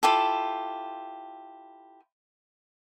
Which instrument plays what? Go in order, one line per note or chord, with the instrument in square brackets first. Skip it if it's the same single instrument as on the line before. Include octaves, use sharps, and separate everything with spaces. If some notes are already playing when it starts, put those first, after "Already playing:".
[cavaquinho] E4 F4 G4 A4